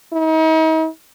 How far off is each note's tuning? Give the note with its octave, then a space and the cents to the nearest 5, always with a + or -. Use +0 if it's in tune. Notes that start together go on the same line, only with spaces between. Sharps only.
D#4 +40